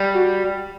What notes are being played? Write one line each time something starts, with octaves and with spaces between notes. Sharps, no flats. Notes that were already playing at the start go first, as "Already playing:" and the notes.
Already playing: G3
F#4